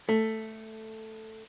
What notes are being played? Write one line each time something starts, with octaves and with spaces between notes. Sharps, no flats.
A3